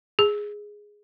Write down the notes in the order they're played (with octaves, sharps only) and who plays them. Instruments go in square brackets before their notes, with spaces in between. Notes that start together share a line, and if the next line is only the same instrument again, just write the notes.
[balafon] G#4